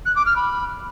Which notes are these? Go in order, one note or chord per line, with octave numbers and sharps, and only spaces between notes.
F#6
D6
F6
B5